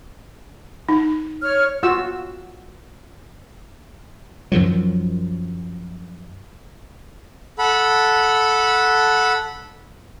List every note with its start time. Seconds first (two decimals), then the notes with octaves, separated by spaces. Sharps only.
0.89 D#4
1.42 C#5 F6
1.83 F4 F#4 E6
4.52 F#2 D#3 F3 F#3
7.59 A4 F#5 B5